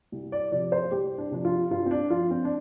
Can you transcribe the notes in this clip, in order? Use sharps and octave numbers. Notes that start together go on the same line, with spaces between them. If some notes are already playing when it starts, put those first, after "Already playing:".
C2
D5
C3 F3 D5
C5
C2 G4
D4
C3 F3 D4
F4
G2 F4
C4
D4
F3 F4
C4
D4